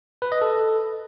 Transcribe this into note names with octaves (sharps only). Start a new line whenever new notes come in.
B4
D#5
A4